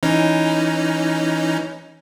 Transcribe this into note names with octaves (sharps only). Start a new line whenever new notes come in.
E3 C#4 D#4